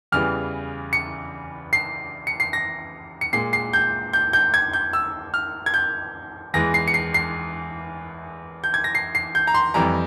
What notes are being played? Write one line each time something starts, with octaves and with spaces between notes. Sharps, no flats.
E2 C#3 E3 G3 F6
C#7
C7
C#7
C7
A#6
C#7
A#2 G#3 C7
C7
G6
G6
G6
G#6
G6
E6
F6
G#6
G6
E2 E3 G#3 A#6
C7
C#7
C7
C7
G6
G#6
A#6
C7
C7
G6
A#5
C6
F2 E3 G3 A#5